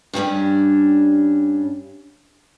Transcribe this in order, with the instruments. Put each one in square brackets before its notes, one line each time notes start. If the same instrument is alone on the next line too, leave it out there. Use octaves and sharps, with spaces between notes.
[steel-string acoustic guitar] G2 G3 C#4 D4